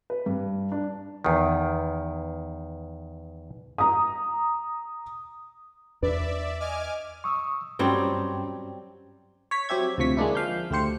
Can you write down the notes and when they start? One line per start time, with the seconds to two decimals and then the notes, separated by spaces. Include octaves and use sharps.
0.10 B4
0.26 G2
0.72 D4
1.24 E2 D#3
3.78 A#5 D#6
6.03 E2 D4 B4 D5 E5
6.60 D#5 G#5 D6 F6
7.24 C#6 D#6 E6
7.79 G2 F#3 G3 C4 C#4 G5
9.51 C#5 B6
9.69 F#3 C4 G4 E5 G#6
9.98 D2 C3 F3 C#6 B6
10.17 G#3 A#3 D4 E4
10.35 F3 F5 G6
10.71 D2 A3 G4 C5 C#7